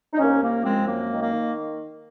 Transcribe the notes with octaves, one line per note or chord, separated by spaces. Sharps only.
D#4
C2 A#3 C#4
C2 A#3
F3 G#3 C4
F#2 A#3
D#3
A#3
D#3